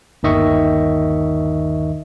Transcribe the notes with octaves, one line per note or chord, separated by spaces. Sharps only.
G1 D#2 D#3 D#5 E5 C#6